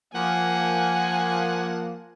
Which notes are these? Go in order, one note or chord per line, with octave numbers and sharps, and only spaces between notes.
F3 A#3 F#5 G#5